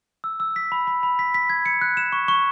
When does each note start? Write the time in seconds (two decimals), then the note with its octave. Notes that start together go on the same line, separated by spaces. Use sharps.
0.24 E6
0.40 E6
0.56 B6
0.72 B5
0.87 B5
1.03 B5
1.19 B6
1.34 B6
1.50 G#6
1.66 C#7
1.81 F#6
1.97 E7
2.13 C#6
2.28 C#6